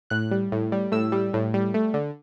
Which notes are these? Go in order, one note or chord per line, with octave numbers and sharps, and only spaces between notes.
A2 F#6
G3
A2
G3
A2 E6
G3
A2
G3
A3
D3